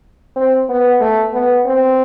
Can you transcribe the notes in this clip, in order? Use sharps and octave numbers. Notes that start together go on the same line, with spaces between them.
C4
B3
A3
B3
C4